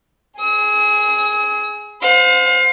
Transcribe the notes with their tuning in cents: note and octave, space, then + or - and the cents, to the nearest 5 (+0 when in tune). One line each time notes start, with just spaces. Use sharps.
G#4 +0 D#6 +45
C5 -20 F5 +35